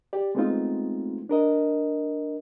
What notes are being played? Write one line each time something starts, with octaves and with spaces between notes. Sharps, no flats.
G4 D5
G#3 A3 B3 C4 D#4 F4
D4 A#4 D#5